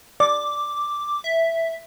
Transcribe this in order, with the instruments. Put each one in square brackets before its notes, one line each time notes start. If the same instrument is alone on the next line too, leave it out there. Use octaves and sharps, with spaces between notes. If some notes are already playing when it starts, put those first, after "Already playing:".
[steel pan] D5 [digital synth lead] D6
[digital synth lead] E5